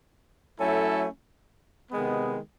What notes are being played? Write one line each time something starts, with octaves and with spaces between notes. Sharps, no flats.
F#3 A3 C#4 E4 A4
C3 D#3 G#3 B3